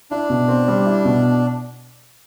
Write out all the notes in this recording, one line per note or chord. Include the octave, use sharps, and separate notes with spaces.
D4 E4
B2
C4
G3
E4
B2